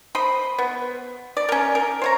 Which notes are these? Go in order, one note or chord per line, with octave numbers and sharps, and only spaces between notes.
C5 D#5 B5
B3
D5
C#4 A#4
A#4
C5 C#5 A#5